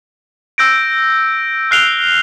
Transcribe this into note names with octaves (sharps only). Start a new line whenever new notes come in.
E6 G6 A#6 D7
F6 F#6 C7 D7 F7 G7